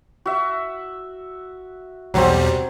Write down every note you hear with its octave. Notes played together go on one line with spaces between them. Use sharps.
F#4 E5
B1 E2 F#3 G3 C4